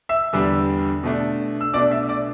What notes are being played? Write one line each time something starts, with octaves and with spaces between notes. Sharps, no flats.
E5 E6
E2 D3 G3 D4
B2 A3 D4
E6
B2 A3 D4 D5 D6
E5 E6
D5 D6